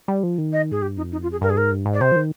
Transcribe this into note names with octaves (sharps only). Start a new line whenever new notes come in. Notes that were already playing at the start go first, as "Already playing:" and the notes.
G3
F3
D#3
D#5
G#2 G#4
G2 G4
F2 D#4
D#4
F4
G#4
G2 A#4
G#4
G#2 A#4
G2
G#2
D5
C3 C5
F3
D#3